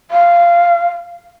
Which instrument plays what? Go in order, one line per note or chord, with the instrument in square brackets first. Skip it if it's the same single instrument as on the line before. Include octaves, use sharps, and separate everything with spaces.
[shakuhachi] F5